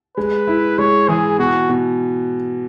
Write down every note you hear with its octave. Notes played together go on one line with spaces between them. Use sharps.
G#3 B4
E4
G#3 C#5
E3 G#4
B2 F#4
B2